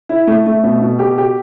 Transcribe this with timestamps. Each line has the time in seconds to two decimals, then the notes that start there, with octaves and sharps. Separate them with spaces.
0.09 E4
0.27 A3
0.46 A3
0.63 B2
0.82 B2
0.99 G4
1.18 G4